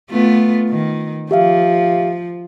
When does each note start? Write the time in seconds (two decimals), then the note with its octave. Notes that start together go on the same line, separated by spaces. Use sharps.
0.10 A3 B3 F4
0.69 D#3
1.31 F3 G4 E5 F5